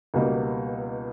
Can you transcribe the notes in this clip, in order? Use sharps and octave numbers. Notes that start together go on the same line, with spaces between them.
C#2 B2 G3 A#3 D#4